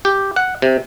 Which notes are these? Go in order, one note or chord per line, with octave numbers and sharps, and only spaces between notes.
G4
F#5
C3